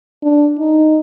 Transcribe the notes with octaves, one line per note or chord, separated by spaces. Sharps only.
D4
D#4